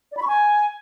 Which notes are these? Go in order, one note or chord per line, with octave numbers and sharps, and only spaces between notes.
D5
B5
C#6
G#5